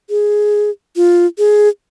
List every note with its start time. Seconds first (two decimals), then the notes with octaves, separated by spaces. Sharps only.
0.10 G#4
0.96 F4
1.38 G#4